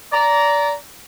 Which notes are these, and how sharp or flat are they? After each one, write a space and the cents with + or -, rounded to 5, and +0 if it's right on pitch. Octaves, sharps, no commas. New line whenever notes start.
D5 -25 A#5 +0